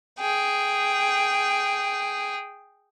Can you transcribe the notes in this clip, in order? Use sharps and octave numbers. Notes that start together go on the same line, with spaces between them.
G#4 G5